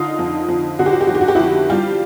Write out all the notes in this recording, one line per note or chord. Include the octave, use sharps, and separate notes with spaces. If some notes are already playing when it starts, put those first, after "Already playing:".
Already playing: D3 D#4 F4
F2
F2
D3 F#4
G4
F#4
G4
F2 F#4
G4
F#4
G4
F2 E4 F#4
G3 F4 G4